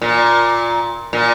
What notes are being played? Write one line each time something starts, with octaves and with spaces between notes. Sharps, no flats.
A#2
A#2